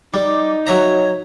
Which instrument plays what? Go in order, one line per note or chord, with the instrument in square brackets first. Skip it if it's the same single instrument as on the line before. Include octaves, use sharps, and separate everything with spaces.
[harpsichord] G3 [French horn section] D#4 [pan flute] D6
[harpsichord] F#3 E5 A#5 [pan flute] C#5